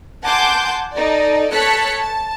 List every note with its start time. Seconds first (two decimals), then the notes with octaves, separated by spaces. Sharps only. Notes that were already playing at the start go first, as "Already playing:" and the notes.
0.23 F#5 G#5 A5 C6 D6 G6
0.93 D#4 A4 D5
1.50 A4 C#5 A5 F#6 B6 C#7
1.99 A5